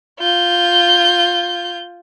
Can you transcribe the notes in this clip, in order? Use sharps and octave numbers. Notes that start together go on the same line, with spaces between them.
F4 G6